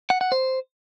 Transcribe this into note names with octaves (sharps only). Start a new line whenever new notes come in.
F#5
F#5
C5